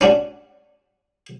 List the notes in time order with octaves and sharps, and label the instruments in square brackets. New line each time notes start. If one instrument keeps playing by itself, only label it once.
[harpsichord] C#4 D4 F#4